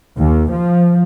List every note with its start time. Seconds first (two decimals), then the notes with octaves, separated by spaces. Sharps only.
0.19 D#2
0.53 F3